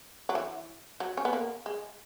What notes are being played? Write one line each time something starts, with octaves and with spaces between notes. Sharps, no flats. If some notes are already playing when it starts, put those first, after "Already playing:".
F#3
E3
F#3
C#4
B3
A#3
G#3